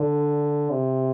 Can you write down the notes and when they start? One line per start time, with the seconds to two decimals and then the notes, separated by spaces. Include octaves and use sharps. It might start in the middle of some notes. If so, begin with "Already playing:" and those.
Already playing: D3
0.71 C3